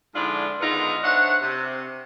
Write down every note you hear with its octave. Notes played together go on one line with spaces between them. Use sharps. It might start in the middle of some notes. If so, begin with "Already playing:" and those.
G#2 D3 F3 D4 E4 F4
D3 D#3 G#3 B3 D#4 F4
D4 C5 C#5 E5 F#5
C3